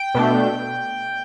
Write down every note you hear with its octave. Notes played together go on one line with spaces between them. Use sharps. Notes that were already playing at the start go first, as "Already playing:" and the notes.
Already playing: G5
B2 A3 D4